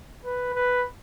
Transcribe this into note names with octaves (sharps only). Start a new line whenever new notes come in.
B4
B4